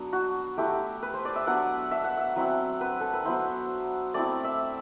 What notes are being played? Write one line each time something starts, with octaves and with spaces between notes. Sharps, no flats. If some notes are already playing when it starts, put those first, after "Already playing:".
Already playing: F#3 B3 D4
F#4
A3 E4 G4
B4
C5
D5
E5
F#3 B3 D4 F#5
E5
F#5
E5
F#3 C4 E4
B4
A4
B4
F#3 B3 E4 C5
A3 C4 E4 D5
E5